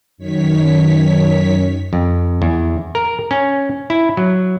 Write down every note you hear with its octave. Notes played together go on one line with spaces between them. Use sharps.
F#2 D#3 C#5 B6
F2
E2
A#4
C#4
E4
F#3